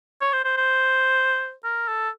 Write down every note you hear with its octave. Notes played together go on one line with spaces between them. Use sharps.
C#5
C5
C5
C5
A#4
A4